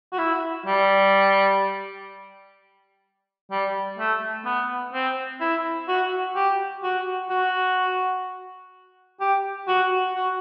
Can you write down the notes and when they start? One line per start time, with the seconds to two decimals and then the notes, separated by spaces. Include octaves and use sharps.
0.12 F#4
0.18 E4
0.66 G3
3.51 G3
3.99 A3
4.45 B3
4.93 C4
5.41 E4
5.88 F#4
6.35 G4
6.83 F#4
7.30 F#4
9.20 G4
9.68 F#4
10.15 F#4